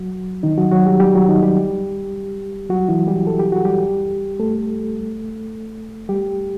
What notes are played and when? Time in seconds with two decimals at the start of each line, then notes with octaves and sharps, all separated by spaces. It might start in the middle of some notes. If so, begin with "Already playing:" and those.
Already playing: F#3 F#4
0.43 D#3 D#4
0.58 F#3 F#4
0.71 F#3 F#4
0.87 G3 G4
1.00 G3 G4
1.15 F#3 F#4
1.28 D#3 D#4
1.43 G3 G4
2.70 F#3 F#4
2.88 E3 E4
3.07 G3 G4
3.27 A4
3.39 G4
3.52 F#4
3.65 G3 G4
4.40 A3 A4
6.09 G3 G4